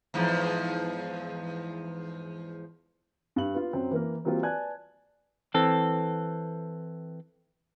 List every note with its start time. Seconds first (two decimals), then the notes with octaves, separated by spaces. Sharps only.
0.14 E2 G#2 F3
3.36 G2 F#7
3.54 B3 F4
3.73 F#2 F#3 C4
3.91 E3 A#3 A#4
4.24 E3 F#3 G3 A#3 C4 F4
4.43 B4 D5 G#5 A5 F#6 G#6
5.54 E3 C4 A4